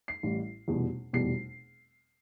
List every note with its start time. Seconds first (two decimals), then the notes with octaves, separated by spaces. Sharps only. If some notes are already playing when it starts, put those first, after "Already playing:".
0.08 C7
0.23 A1 A2 G3
0.68 F1 E2 B2 G3
1.13 F1 E2 B2 G3 C7